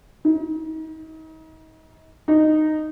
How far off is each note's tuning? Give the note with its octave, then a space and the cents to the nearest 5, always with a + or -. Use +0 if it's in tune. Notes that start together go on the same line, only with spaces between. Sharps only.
D#4 +35
D#4 -10